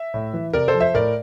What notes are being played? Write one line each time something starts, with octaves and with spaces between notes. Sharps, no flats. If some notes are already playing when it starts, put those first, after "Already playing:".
Already playing: E5
A2
E3
C3 A#4 D5
A4 C5
F3
C5 E5
A2 A#4 D5